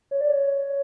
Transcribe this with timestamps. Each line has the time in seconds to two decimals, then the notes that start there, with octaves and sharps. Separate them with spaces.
0.11 C#5
0.21 D5
0.31 C#5